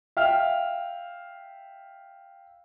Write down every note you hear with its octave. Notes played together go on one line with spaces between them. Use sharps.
E5 F5 G5 F6